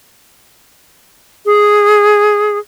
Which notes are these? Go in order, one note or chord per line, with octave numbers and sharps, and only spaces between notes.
G#4